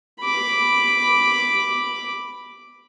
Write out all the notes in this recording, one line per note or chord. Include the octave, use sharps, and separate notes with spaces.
B5 D6